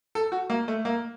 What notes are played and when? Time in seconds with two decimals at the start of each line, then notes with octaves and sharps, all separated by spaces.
0.15 A4
0.32 F#4
0.50 A#3
0.68 A3
0.85 A#3